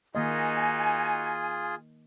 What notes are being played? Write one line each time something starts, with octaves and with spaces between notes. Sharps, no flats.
D#3 A#3 D#4 F4 F#4 G#4 D#5 G#5